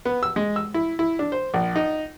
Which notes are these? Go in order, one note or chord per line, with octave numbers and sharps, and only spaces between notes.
B3
E6
G#3
E6
E4
E4
D4
C5
A#1
D#4